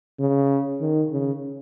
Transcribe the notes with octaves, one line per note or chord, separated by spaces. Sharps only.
C#3
D#3
C#3